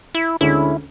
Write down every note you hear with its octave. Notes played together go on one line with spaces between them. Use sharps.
E4
D2 D3 G#3 C#4 E4